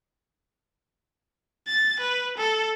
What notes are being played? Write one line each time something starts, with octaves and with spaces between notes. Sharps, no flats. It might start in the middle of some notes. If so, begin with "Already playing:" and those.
A6
B4
A4